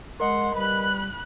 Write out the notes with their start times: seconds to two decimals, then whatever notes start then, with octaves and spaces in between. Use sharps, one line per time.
0.20 G#3 A#4 D#5 F#5 C6
0.55 G3 B4 B5 F#6